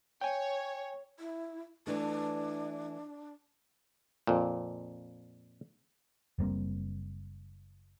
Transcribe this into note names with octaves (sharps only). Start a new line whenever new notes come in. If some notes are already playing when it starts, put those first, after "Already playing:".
C#5 G5 G#5
E4
E3 A3 D4
F2 A#2
F#1 G3 A#3 C4